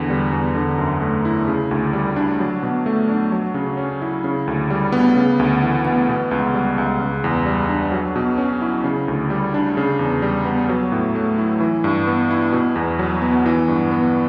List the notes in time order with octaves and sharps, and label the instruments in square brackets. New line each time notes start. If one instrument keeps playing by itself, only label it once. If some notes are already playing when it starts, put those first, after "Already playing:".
Already playing: [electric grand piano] E2 D3
G3
E2
D3
F#2
A3
E4
C#3
D2
G3
D4
F#3
B2
A3
D4
F#3
C#3
C#4
E4
C#3
D2
G3
B3
C#3
D2
E3
B3
B2
C#2
G3
C#2
C#3
E2
G3
D4
F#3
B2
C#4
E4
C#3
D2
G3
D4
C#3
E2
G3
B3
F#3
A2
A3
E4
E3
G2
B3
E4
B2
E2
F#3
B3
E3
G2
B3